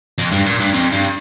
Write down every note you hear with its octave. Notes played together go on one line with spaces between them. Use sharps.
F2
G2
A#2
G2
F2
G2